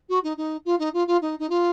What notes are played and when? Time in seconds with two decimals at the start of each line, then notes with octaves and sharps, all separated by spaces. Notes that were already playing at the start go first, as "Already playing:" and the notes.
0.09 F#4
0.23 D#4
0.37 D#4
0.65 F4
0.79 D#4
0.94 F4
1.07 F4
1.21 D#4
1.39 D#4
1.49 F4